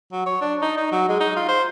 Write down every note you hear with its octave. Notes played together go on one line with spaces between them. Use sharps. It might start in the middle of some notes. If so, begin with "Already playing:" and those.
F#3
C#5
D4
D#4
D#4
F#3
G#3
D#4
F4
C5